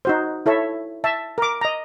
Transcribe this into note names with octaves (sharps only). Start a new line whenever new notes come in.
D#4 F#4 C5
E4 A4 C#5 E5
E5 A5
A#4 D6
D#5 A#5